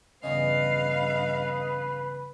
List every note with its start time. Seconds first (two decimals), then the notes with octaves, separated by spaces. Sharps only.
0.23 E2 G2 C#3 B4 D#5 F5